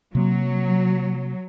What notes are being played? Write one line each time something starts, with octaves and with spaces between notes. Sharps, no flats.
C3 F#3 A#3